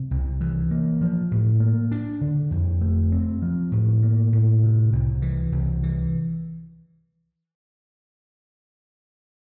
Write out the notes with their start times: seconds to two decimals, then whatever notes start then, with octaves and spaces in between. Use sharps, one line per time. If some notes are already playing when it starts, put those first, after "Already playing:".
Already playing: C3
0.11 C2
0.41 E3
0.71 A#3
1.01 F3
1.31 A2
1.60 A#3
1.91 D4
2.21 D3
2.51 F2
2.81 A3
3.12 C4
3.42 F3
3.72 A2
4.03 A#3
4.32 A2
4.63 C3
4.92 C2
5.22 E3
5.52 C2
5.83 E3